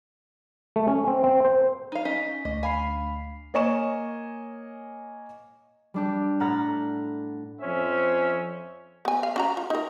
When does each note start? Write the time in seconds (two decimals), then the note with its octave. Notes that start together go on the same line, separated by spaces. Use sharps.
0.76 A3
0.87 C#4
1.07 C4
1.24 C4
1.45 C5
1.92 D#4 F5
2.05 C#4 D#4 D#5 B6
2.45 D2 D#5
2.63 F5 G#5 B5 C7
3.54 A#3 C#5 D#5 G#5 C#6 E7
5.94 G3 D4 G4
6.40 A2 F#5 A#5 F6 A6 B6
7.61 F2 C#4 C5 C#5 E5
9.05 B3 G#5
9.23 F5
9.36 C#4 F#4 A#5
9.57 F4
9.70 D#4 A#4